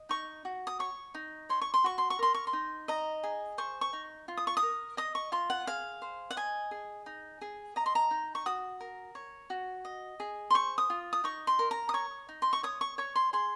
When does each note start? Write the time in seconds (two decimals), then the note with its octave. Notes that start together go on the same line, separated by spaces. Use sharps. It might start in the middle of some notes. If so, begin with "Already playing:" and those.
Already playing: D#5
0.09 D#4 C#6
0.45 F#4
0.67 D#6
0.79 C#5 C#6
1.15 D#4
1.49 C#5 C6
1.61 C#6
1.74 C6
1.84 F#4 C#6
1.98 C6
2.10 C#6
2.19 A#4 C6
2.34 C#6
2.47 C6
2.53 D#4
2.88 D#5 A#5
3.23 G#4
3.58 C5 C#6
3.81 C#6
3.93 D#4
4.28 F4
4.37 D#6
4.47 C#6
4.57 D#6
4.63 A#4
4.97 D#5 D#6
5.15 C#6
5.32 F4 C6
5.50 F#5
5.67 G#4 F5
6.02 C5
6.31 F#5
6.37 D#5 G#5
6.71 G#4
7.06 D#4
7.41 G#4
7.76 D#5 A#5
7.86 C6
7.95 A#5
8.11 D#4
8.35 C#6
8.46 F#4 D#6
8.80 A#4
9.15 C#5
9.50 F#4
9.85 D#5
10.20 G#4
10.50 C6
10.54 C5 C#6
10.78 D#6
10.90 F4
11.13 D#6
11.24 D#4 C#6
11.47 C6
11.59 A#4
11.71 A#5
11.89 D#6
11.94 C#5 C#6
12.29 D#4
12.42 C6
12.53 C#6
12.63 C#5 D#6
12.81 C#6
12.98 C#5 C#6
13.15 C6
13.33 G#4 C6